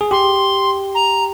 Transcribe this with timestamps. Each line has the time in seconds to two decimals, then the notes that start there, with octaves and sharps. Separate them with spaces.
0.01 G#4
0.11 G4 C6
0.95 A#5